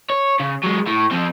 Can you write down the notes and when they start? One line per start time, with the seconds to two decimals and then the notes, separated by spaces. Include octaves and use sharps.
0.10 C#5
0.40 C#3
0.64 F#3 G#3
0.87 A2
1.11 F3 C4